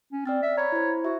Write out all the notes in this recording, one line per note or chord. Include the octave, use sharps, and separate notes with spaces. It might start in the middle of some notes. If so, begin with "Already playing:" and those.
C#4
C4 D5 F6 A6
E5
C#5 A#5 B5
E4 C5
F#4 E5